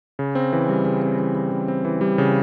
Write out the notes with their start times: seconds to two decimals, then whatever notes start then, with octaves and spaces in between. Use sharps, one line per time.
0.19 C#3
0.35 C4
0.53 E3
0.69 G3
0.85 C#3
1.02 C4
1.19 E3
1.35 G3
1.52 C#3
1.68 C4
1.85 E3
2.01 G3
2.18 C#3